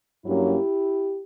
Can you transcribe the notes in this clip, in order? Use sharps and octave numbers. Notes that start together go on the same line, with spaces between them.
G2 F#3 A#3 C#4 E4 G4